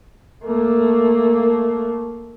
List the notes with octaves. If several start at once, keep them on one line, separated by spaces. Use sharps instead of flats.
A3 A#3